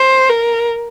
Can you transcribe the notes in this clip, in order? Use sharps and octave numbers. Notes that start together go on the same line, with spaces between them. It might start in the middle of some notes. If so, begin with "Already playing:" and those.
Already playing: C5
A#4